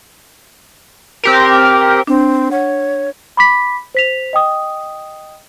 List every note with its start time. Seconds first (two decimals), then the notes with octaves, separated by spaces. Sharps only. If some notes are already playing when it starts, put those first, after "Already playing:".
1.24 C4 G4 A#4
2.07 C4 D4
2.51 C#5 F#5
3.37 B5 D6 B6
3.95 C5 B6 F7
4.33 D#5 G5 D#6